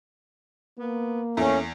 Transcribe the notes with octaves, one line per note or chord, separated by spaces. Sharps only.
A#3 B3
E2 A3 C#4